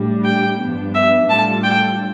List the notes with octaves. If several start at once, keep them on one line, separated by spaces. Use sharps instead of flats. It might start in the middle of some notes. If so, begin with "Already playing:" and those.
Already playing: A2 G3 D4
G5
G2 F3 B3 D4
E5
A2 G3 D4 F4 A4 A5
G5